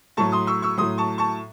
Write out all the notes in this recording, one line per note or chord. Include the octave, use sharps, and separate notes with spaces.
A2 F#3 A5 C#6
C6 D#6
C#6 E6
C#6 E6
A2 F#3 C6 D#6
A5 C#6
A5 C#6